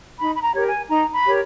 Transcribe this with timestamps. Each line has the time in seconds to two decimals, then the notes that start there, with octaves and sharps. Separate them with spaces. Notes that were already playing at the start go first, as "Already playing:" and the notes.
0.19 D#4 B5
0.34 B5
0.43 A#5
0.55 G4 A#4 C#5
0.67 G#5
0.90 D#4 A#5
1.14 B5
1.25 G4 A#4 C#5